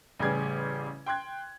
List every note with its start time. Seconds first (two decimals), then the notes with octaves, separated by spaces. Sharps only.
0.20 A1 C#3 G3 G#4 D5 G#6
1.06 G5 C6 F#6 G#6